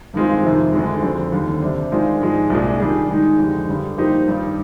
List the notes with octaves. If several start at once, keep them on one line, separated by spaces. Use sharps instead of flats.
G2 D#3 G#3 C4 F4
F2 C3 D#3
D2 D3 G#3
F2 D3 G3 C4
D#2 D3 G3 C4
C3 G3 D4
D#3 G#3 D4 F4 C5
G#2 F3 G#3
C2 A#2 G#3 D4
D#3 G3 D4 G#4
D#3 G#3 D#4
F2 D3 G#3 D#4 G4
G2 D3 G3
F3 A#3 D#4 G4 C5
G2 D#3 G3